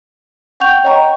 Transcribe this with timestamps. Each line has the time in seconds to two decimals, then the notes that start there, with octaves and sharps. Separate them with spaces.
0.60 F#5 G5 C#6 G6 F7
0.84 C#5 D#5 G5 A#5 C#6